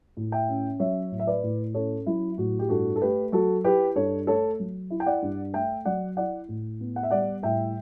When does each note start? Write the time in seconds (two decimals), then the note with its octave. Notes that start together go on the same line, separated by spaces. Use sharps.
0.17 A2
0.32 E5 G5
0.49 C#4
0.79 F#3 C#5 E5
1.12 A2
1.19 E5
1.27 B4 D5
1.43 A2
1.74 C#4 A4 C#5
2.07 F#3 E4
2.38 A2 F#4
2.59 G4
2.69 G2 F#4 A4
2.96 A4
3.01 A3 G4 B4
3.32 F#3 F#4 A4
3.64 E4 G4 B4
3.96 G2 A4 C#5
4.27 A3 A4 C#5
4.60 F#3
4.91 E4
5.00 G5
5.06 D5 F#5
5.22 G2
5.54 A3 E5 G5
5.85 F#3 D5 F#5
6.17 E4 D5 F#5
6.49 A2
6.81 B3
6.96 F#5
7.03 E5
7.10 G3 D5 F#5
7.43 A2 E5 G5